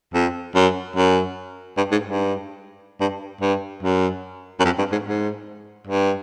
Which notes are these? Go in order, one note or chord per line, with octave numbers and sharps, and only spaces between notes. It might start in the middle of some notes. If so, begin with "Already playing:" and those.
F2
F#2
F#2
G2
G#2
G2
G2
G2
F#2
F#2
F2
G2
G#2
G#2
G2